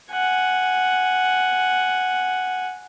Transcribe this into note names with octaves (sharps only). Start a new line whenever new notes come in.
F#5 G#5